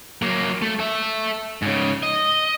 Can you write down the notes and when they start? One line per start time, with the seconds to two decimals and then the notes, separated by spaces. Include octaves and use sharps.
0.22 F#3 A#3
0.62 A3
0.79 A4 E5
1.62 G#2 C#3
2.03 D#5